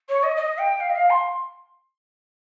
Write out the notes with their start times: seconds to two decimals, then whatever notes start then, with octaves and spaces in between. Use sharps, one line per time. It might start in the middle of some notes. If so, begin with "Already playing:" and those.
0.08 C#5
0.23 D#5
0.36 D#5
0.58 G5
0.80 F5
0.89 D#5
0.95 F5
1.10 C6